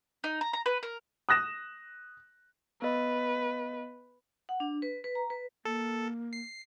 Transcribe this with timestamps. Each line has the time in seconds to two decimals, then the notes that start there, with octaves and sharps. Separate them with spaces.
0.24 D#4
0.41 A#5
0.53 A#5
0.66 B4
0.83 A#4
1.29 D#6 F#6 A#6 E7
2.82 B3 B4 D#5
4.49 F#5
4.60 D4
4.82 B4
5.04 B4
5.15 A#5
5.30 B4
5.65 A#3 A4
6.33 C7